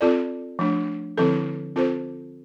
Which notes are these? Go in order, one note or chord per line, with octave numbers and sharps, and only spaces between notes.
C4 F4 A4 D5
F3 A3 D4
D3 F3 C4 E4 A4
C4 F4 A4 C5